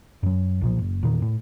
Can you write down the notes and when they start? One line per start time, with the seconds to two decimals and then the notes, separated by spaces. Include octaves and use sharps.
0.23 F#2 F#3
0.61 B1 A#2 F3
0.79 F#1
1.03 E2 A#2 D#3
1.22 A2